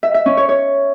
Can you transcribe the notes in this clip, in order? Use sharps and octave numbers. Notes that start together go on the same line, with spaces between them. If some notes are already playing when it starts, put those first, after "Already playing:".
E5
E5
C#4
C#5
C#5